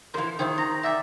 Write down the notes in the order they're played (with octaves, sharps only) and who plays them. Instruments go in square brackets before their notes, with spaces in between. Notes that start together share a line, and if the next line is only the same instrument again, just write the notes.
[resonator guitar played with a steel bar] E3 F3 [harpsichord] F4 A#4 [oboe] C5
[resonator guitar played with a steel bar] D#3 [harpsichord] E4 C5 G5 [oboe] G#4
[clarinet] A#5 [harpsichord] C6
[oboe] D5 [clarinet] E5 [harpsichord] F#5 G5